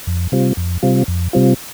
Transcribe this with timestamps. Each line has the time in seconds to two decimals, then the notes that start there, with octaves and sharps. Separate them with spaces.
0.07 F2
0.32 C3 G3 C4 F4
0.57 F2
0.83 C3 G3 C4 F4
1.08 F2
1.33 C3 G3 C4 F4